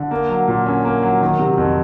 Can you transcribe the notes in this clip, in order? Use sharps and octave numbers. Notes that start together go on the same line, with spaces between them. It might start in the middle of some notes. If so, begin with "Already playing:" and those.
Already playing: D3
A#3
F#3
A#2
C#4
A#3
F#3
D#3
C3
F2